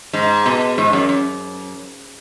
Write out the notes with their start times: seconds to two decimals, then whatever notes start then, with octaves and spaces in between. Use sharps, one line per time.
0.13 G#2
0.46 B2
0.78 G#2
0.93 F#2
1.09 F#2